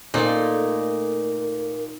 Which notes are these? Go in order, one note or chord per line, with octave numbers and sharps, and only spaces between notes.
A#2 A3 D#4 F4 A4 A#4 D5